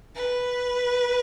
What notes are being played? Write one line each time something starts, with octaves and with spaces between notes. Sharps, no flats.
B4